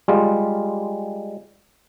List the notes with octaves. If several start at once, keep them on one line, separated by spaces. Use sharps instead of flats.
G3 G#3 F4